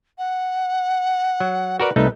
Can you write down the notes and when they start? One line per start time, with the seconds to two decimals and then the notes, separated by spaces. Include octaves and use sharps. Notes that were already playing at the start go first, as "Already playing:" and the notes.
0.18 F#5
1.40 F#3
1.80 F#4 A#4 B4 D5
1.96 C2 A3 D#4 B4